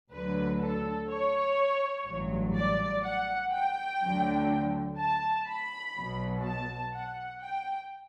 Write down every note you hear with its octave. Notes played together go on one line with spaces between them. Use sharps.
D2 D3 F#3 B4
A4
C#5
A1 G2 F#3
D5
F#5
G5
D2 D3 F#3
A5
B5
B1 B2 F#3
A5
F#5
G5